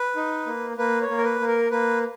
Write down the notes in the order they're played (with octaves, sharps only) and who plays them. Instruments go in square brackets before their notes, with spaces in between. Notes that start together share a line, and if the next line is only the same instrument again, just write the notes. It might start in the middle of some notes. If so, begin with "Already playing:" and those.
Already playing: [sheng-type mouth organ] B4
D#4
A#3
A#3 B4
C#5
A#3
A#4
B4
A#3
A#4
A#3 B4